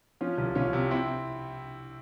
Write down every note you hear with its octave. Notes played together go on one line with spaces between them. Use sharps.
F3 C#4 F4
C2
C2 C#4 F4
C3
C4 E4